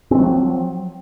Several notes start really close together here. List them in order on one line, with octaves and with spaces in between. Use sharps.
C4 G#3 F#3 F3